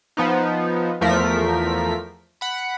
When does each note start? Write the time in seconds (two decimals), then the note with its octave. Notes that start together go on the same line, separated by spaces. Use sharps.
0.17 F3 B3 D#4
1.01 E2 F3 A3 A#4 B6
2.41 F#5 B5